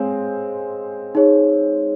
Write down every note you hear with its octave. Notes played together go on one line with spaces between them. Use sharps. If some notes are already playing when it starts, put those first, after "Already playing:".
Already playing: G#3 C4 C#5 F5 G#5
D#4 G#4 C#5